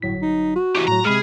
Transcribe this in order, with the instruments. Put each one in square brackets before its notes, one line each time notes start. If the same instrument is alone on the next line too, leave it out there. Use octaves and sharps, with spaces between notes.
[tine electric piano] G1 F#3 B6 [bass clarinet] A2
[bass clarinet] D#4
F#4
[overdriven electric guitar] E3 G4
[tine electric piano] A2 F#3 [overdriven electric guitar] A#5
[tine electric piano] C3 B5 F6 [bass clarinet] G#3 [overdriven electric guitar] G#4